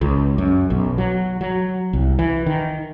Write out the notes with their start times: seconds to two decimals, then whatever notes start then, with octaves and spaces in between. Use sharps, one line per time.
0.01 C#2
0.38 F#2
0.70 B1
0.98 F#3
1.41 F#3
1.93 C2
2.19 E3
2.46 D#3